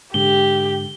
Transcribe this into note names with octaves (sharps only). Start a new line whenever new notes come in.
G#2 D3 G4 G7